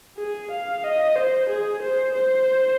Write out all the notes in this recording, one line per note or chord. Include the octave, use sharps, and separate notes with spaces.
G#4
F5
D#5
C5
G#4
C5
C5